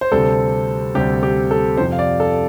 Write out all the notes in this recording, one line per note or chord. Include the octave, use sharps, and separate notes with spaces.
C5
D2 C3 G3 C4 A4
D2 C3 G3 C4 G4
G4
A4
F2 C3 F3 C5
F5
D5
A4